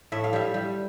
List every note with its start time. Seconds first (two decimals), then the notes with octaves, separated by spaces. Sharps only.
0.12 A2 E5
0.24 F5
0.33 G3 E5
0.54 G3